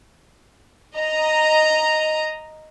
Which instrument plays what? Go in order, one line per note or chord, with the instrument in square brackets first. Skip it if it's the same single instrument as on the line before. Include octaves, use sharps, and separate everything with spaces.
[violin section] D#5 A#5